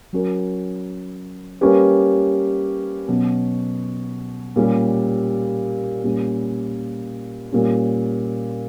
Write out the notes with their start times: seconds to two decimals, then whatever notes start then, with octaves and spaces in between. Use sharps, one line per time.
0.13 F#3 C#4 F#4 A#4
1.61 G3 A#3 C#4 G4 B4
3.08 B2 F#3 C#4
4.56 A#2 G3 C#4 G4
6.04 A#2 G3 C#4
7.52 A#2 G3 C#4